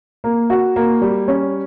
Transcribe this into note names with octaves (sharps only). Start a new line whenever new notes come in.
A#3
F#4
A#3
G3
C#4